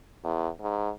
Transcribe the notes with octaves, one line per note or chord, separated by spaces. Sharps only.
E2
G#2